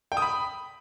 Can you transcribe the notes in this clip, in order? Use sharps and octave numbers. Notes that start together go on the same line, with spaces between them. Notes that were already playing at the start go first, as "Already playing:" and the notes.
G5
D#6
B5